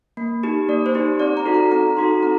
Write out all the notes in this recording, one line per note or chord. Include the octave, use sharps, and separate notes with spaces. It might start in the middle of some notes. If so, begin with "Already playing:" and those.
A#3
D#4 G4
A#3 D5
C5
D#4 G4
C4 D5
A#5
D#4 F#4 A4
A#5
C4 A#5
D#4 F#4 A4 C6
C4 A#5